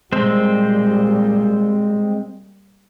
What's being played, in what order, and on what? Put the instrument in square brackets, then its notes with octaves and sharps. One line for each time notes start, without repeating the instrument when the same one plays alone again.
[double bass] A#2 G3 [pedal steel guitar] G#3 C4 C5